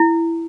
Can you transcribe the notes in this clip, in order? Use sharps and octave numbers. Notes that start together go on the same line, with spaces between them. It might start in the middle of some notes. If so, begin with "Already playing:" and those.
Already playing: E4